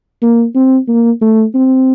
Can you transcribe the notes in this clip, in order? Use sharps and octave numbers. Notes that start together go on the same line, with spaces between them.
A#3
C4
A#3
A3
C4